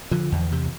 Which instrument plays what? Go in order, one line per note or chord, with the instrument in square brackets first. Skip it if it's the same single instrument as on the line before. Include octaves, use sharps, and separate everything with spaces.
[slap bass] D3 F3
E2
C3